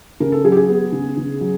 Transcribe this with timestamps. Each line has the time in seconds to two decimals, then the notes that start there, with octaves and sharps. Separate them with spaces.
0.20 C#3 A#4
0.32 A4
0.44 F#3 G#4
0.52 G4
0.57 G#4
0.69 B3
0.92 C#3
1.17 C#3
1.41 F#3